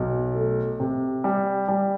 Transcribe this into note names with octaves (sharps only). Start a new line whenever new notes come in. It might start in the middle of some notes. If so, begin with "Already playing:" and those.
Already playing: B1
A3
C3
G3
G3